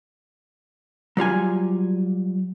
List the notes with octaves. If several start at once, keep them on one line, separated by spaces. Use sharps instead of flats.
F#3 G3 F4 G#5